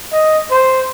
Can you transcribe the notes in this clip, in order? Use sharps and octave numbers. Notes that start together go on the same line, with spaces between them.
D#5
C5